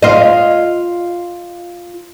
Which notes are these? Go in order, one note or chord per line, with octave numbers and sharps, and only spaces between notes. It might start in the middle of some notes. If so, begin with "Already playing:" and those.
F4 D#5